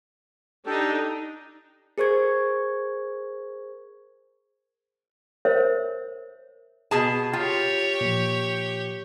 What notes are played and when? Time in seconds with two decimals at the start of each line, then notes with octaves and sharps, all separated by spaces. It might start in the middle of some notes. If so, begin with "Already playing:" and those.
0.66 D4 D#4 G4 A4
1.98 G#4 A#4 C5 C#6 G#6
5.45 A#4 C5 C#5 E5
6.91 B2 G#4 A5
7.33 F4 G4 C#5 G5
8.01 A#2 F3